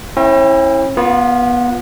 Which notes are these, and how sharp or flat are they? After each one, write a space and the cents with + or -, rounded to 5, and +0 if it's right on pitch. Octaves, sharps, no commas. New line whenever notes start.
C#4 -45 E4 -10 G5 +5
B3 -20 F4 +15